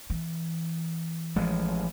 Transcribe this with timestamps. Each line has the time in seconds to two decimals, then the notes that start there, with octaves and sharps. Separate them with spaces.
0.10 E3
1.36 A1 F3 G#3